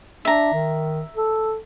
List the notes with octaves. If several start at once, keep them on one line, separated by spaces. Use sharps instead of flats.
D4 E5 A#5
D#3
A4